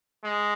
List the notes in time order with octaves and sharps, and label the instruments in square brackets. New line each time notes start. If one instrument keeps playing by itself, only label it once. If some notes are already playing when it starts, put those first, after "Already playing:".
[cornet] G#3